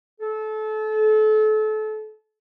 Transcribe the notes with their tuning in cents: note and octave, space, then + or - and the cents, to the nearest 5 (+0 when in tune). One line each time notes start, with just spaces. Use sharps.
A4 -30